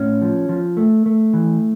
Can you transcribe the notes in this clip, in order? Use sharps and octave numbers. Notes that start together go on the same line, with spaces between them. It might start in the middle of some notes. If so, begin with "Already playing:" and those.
Already playing: A2 C#4
F3
F3
A3
A3
E3